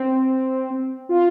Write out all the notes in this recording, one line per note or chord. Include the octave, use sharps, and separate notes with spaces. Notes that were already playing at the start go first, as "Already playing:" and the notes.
Already playing: C4
F4